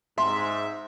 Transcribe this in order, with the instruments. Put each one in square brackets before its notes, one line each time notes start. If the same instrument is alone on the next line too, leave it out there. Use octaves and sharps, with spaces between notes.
[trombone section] G#2 [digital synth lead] E5 [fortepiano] C6